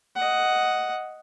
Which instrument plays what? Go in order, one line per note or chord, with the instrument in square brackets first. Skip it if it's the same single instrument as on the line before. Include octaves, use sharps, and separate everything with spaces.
[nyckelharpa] D#5 F#5